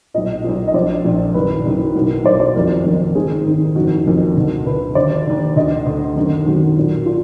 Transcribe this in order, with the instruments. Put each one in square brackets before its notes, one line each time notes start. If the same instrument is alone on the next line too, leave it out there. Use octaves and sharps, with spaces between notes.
[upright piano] B1 A#2 D#5
B1 A#2
D#5
A#1 A#2 D5
A#1 A#2
F#1 F#2 D#3 B4
F#1 F#2 D#3
B1 B2 A#4
B1 B2 D5
D5
F#1 F2 D#3 A#4
F#1 F2 D#3
G#1 G#2 D#3 G#4
G#1 G#2 D#3
F#1 F2 D#3 F#4
F#1 F2 D#3 A#4
D2 D3
D2 D3 B4
D#2 D3 D5
D#2 D3
D2 D3 D#5
D2 D3
G#1 F#2 D#3
G#1 F#2 D#3 F#4
B1 A#2
A#2 F4